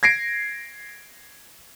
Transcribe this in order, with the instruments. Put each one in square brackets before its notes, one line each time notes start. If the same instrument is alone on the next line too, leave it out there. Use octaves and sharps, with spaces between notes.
[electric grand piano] G#6 A#6 C7 D7